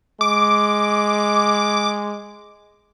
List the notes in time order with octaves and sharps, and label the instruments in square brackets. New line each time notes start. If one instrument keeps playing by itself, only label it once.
[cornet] G#3 [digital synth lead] D6